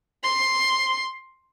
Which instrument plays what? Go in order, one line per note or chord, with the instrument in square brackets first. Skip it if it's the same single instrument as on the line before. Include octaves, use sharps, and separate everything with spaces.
[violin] C6